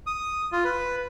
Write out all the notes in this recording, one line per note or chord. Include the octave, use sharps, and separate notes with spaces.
D#6
F4
B4